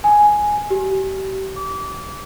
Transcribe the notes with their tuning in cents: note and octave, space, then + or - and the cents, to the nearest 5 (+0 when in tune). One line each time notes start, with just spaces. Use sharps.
G#5 +5
G4 -35
D6 -30